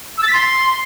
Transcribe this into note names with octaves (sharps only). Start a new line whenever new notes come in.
E6
A6
B6
C6